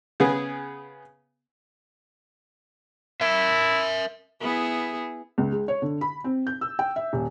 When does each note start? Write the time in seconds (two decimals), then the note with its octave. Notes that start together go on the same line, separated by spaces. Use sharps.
0.20 C#3 B3 G#4
3.21 E4 A#4 E5
4.40 B3 E4 G#4
5.38 C#2
5.52 G#3
5.68 C#5
5.82 D3
6.01 B5
6.24 C4
6.47 G6
6.61 E6
6.79 G5
6.96 E5
7.13 D#1